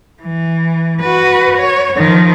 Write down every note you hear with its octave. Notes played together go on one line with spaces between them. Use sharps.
E3
F#4 B4
C#5
D#3 F3